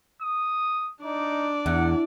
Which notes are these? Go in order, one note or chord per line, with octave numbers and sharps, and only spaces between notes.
D#6
D4 D#4 D5
E2 F#5